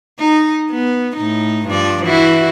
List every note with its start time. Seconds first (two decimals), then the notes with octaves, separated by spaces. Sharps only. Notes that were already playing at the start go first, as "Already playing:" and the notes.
0.19 D#4
0.72 B3
1.16 A2 D#4
1.67 G2 F3 D5
2.04 E3 E4 F#4